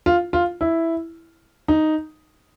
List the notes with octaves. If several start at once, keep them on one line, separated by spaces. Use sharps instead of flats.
F4
F4
E4
D#4